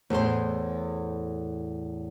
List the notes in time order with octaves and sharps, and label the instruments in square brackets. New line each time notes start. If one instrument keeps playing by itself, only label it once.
[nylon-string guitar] E2 A2 G#4 C5